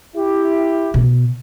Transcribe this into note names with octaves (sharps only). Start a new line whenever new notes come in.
E4 G4
B2